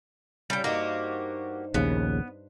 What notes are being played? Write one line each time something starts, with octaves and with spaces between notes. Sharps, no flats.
A2 C#3 G3 G5
G2 A#3 D#4 F#4 G4 C5
A#1 D#2 C#3 B3